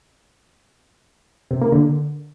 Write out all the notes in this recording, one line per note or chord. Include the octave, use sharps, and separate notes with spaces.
C3
A#3
D3